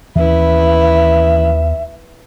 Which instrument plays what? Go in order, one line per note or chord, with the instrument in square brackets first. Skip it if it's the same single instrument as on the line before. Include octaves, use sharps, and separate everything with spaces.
[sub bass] D#2 [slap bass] E3 C#4 [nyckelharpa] E4 B4 [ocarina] E5